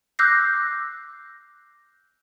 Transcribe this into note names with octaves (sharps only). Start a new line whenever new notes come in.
D6 E6 F#6 G6 A#6 C7